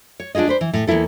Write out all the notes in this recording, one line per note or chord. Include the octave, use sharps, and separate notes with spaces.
C#5
D4 D#4 F4 G#4 D#5
D4 B4 C5
E3
A2
E2 C#3 A#3 E4 A4